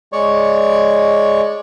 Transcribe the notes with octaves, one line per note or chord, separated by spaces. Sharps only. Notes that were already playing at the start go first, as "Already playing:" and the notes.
G#3 C#5 D5 C#6